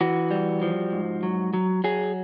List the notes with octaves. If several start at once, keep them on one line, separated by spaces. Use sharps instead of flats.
E3 F#4
G3
F3
G#2
F#3
F#3
F#3 G#4